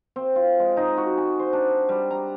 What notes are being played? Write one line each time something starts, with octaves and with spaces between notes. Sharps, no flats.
C4
F4
G#3
D#4
F#4
G#5
C5
D4
G3
A#5